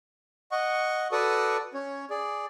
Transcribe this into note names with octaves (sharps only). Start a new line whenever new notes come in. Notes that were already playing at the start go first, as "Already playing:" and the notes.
D#5 F#5 C#6
F#4 A4 B4 D5 C#6 D#6
C#4 C#5
G#4 D5